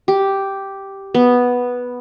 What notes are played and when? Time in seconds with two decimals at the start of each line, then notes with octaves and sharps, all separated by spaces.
0.08 G4
1.14 B3